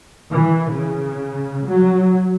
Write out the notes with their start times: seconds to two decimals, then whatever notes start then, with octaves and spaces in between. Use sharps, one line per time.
0.31 E3
0.70 C#3
1.67 F#3